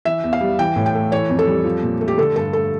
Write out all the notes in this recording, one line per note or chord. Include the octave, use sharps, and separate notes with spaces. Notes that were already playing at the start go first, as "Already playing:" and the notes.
E3 E5
E2
F5
G3
E3 G5
A2
G5
A3
E3 C#5
F2
A4
G3
F3
A#2
A3
G4
D3 A4
G2 A4
A3 A4